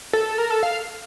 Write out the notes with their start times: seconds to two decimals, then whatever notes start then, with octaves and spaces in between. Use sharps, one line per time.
0.13 A4
0.38 A#4
0.50 A4
0.63 F5